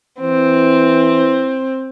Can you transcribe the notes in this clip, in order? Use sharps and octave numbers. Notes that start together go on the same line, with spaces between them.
E3 C4